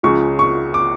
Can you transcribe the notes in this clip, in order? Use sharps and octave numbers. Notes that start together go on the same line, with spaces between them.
C#2 C#3 F3 C#6
C#6
D6